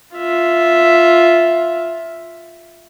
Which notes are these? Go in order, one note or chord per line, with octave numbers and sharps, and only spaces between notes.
F4 E5